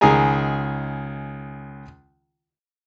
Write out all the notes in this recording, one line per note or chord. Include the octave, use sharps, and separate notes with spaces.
C#2 D#3 G#4 G#5 A#5